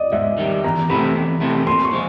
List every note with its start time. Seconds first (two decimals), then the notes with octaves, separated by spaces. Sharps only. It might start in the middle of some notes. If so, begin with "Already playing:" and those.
Already playing: D5 D#5
0.12 G#2 E5
0.38 D#3 G3
0.64 E2 A#5
0.90 C3 E3 A3 C4 B5
1.15 E2
1.41 C3 E3 A3 C4
1.67 A#2 C6
1.85 C#6
1.93 F3 G#3